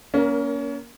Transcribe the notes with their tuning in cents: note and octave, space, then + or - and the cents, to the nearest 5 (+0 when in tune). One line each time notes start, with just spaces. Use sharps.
A#3 +25 C#4 +30 A#4 +0